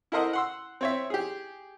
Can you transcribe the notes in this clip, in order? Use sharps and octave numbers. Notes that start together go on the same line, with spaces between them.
E4 A4 A#4 C5 D#5 F#5
F#5 C6 E6
C4 C#5 E5
G4 G#4